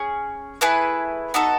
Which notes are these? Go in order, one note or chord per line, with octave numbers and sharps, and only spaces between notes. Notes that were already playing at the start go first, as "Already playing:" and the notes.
Already playing: C#4 G#4
A3 E4 G#4 B4
B3 D#4 F#4 A4